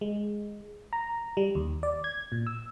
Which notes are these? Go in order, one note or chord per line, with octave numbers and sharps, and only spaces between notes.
G#3
A#5
G3
D#2
D5
G#6
A#2
E6